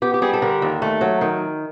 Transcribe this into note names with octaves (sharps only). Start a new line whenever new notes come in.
B3 G4
G4
G3 G#4
A4
D3 A#4
D#2
A3
F#3
D#3